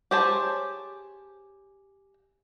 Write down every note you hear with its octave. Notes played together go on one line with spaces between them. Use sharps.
G4 G#4 C5 C#5 A5